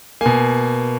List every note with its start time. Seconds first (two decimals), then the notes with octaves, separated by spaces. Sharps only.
0.21 B2 A#3 G#5